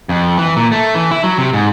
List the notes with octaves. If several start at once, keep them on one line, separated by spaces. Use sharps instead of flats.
F2
E3
A#2
A3
E3
E4
F#3
C3
G#2